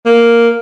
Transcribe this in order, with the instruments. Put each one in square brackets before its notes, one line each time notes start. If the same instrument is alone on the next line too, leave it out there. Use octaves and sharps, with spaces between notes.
[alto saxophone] A#3